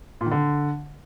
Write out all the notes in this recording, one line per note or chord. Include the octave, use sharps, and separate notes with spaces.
A#2
D#3
D3